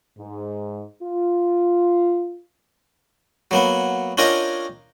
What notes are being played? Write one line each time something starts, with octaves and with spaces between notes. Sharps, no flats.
G#2
F4
F#3 A#3 B3
C#4 D4 F4 A#4 D#5 G5